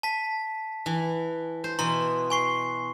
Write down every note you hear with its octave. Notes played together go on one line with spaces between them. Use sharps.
A5 B6
E3
C5
B2 E3 A#5 C6
G#5 C#6 C7